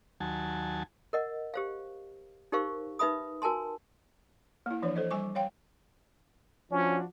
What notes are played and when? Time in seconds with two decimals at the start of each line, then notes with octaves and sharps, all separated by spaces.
0.20 D#2 F#3 G#5 A5
1.13 A#4 D#5 F#5
1.54 G4 C5 F5
2.52 D#4 G4 A#4 C5 F5 C#6
2.99 D#4 B4 E5 B5 D#6
3.42 F#4 A#4 G#5 A5 C6
4.66 A#3 E4
4.82 E3 F3 D4 C#5
4.96 A4 C5 D#5
5.11 G3 G#5 C#6 D6
5.35 C#5 F5 G5
6.72 F3 C#4 D4 F#4